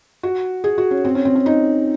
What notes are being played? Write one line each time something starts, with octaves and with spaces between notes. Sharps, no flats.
F#4
G#4
F#4
C#4
C4
C#4
C4
C#4
D#4